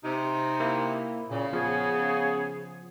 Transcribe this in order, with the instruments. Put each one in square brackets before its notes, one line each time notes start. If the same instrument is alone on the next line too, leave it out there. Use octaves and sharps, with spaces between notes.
[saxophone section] C3 [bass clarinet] D#4
[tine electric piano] A#3 E4
[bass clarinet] A#2 [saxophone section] C#3
[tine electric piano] F3 [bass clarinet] B3 [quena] G#4